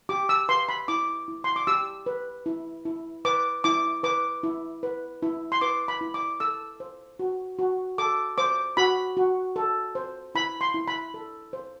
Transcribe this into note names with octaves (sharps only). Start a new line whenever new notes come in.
G4 D6
E6
B4 C6
B5
E4 D6
E4
C6
D6
G4 E6
B4
E4
E4
B4 D6
E4 D6
B4 D6
E4
B4
E4
C6
B4 D6
B5
E4
D6
A4 E6
C5
F#4
F#4
A4 D6
C5 D6
F#4 B5
F#4
A4
C5
E4 B5
C6
E4
B5
A4
C5